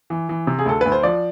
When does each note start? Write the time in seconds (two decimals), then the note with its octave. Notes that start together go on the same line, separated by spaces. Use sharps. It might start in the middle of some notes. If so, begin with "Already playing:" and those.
0.10 E3
0.29 E3
0.47 C3
0.59 G#4
0.66 D2 A4
0.81 D2 B4
0.92 C5
1.03 F3 D5